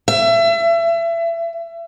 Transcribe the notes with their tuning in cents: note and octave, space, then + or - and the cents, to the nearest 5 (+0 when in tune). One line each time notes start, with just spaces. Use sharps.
E5 +30